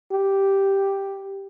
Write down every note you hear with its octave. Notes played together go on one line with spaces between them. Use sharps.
G4